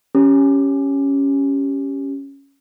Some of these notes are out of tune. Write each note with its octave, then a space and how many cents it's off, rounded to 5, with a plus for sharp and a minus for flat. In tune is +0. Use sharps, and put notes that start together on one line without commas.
C#4 +0 G4 +0